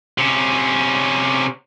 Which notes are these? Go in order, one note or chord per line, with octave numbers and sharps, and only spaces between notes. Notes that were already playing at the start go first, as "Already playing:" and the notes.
C3 C#4